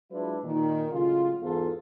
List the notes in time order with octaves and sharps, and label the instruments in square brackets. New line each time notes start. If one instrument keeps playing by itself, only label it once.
[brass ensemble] F#3 G#3 D4 E4 F4 B4
A#2 D#3
A2 C#3 F#3 G#3 C#4 F4
E2 G#2 F4 A4